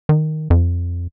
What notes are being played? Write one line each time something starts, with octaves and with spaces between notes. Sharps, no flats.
D#3
F2